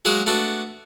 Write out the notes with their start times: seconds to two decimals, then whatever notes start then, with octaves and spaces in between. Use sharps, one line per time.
0.05 F#3 G#3 A#3 F#4 G#4
0.27 A3 B3 D4 F#4